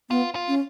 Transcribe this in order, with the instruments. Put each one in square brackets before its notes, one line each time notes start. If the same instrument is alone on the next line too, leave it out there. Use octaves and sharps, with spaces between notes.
[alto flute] B3 [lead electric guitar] F4
[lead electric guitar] F4
[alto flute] C#4